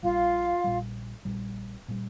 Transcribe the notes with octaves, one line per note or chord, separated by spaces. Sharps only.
A#1 A#2 G3 F4 F5
A#1 A#2 G3
A#1 A#2 G3
A#2 G3